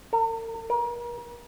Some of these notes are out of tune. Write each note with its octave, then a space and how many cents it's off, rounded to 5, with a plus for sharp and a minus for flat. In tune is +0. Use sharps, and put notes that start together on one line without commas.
A#4 -45
A#4 +40